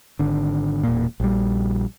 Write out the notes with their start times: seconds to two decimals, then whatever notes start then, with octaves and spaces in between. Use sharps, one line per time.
0.19 G#1 D3
0.83 E1 A#2
1.20 A#1 G3